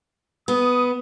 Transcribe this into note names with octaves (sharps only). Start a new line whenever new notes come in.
B3 D#6